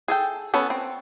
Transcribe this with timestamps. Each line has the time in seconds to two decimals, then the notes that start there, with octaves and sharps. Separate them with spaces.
0.08 G#4 A4 G5
0.54 B3 C#4 A4
0.70 C4